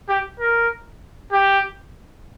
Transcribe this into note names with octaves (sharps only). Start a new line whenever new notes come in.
G4
A#4
G4